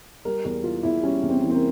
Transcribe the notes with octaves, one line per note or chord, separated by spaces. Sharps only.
G3 A#4
E2 A#4
E3 F4
E2 E4
G3 C#4
E2
C4
E3
C4
A#3